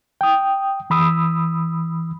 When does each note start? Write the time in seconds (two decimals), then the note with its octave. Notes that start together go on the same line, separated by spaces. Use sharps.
0.21 G5 D#6
0.90 E3 B5 D#6 E6